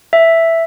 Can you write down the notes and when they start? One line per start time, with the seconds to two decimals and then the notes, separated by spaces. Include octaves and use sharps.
0.13 E5